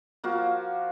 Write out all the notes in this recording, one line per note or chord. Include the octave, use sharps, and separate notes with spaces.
F3 A#3 F#4 F5